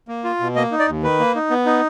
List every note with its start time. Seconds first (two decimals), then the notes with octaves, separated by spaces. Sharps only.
0.08 A#3
0.24 F4
0.40 B2
0.56 A#3 D#5
0.72 D#4
0.79 D5
0.87 D#2
1.03 D#3 B4
1.20 A#3
1.35 D#4
1.50 B3
1.66 D#4